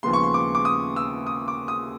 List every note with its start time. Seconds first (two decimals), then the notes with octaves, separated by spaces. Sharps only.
0.03 D#2 C#3 F3 G#3 B3 C6
0.13 C#6
0.24 C6
0.34 D6
0.55 D6
0.65 D#6
0.96 E6
1.27 D#6
1.48 D6
1.68 D#6